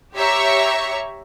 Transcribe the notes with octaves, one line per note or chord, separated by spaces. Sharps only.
G4 C#5 E5 A#5 C#6